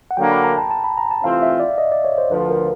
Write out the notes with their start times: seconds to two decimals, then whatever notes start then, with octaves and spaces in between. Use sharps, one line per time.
0.11 F#5
0.17 D3 F#3 A#3 D4 G5
0.31 B5
0.44 A#5
0.58 A5
0.71 A5
0.84 B5
0.98 A#5
1.11 A5
1.24 C3 E3 A3 C4 F4 F5
1.42 E5
1.60 D5
1.78 D#5
1.92 D5
2.04 C#5
2.18 C5
2.31 D2 D3 F3 B4
2.50 A#4